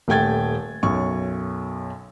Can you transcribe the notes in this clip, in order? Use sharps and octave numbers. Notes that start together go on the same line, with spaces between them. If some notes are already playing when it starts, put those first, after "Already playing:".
D#1 A3 G5 G#6 A6
B1 F#2 C#6